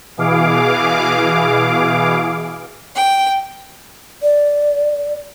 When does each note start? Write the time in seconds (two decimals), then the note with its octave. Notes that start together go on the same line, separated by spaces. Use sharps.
0.17 B2 E3 G#4 F5 D6
2.95 G5
4.23 D5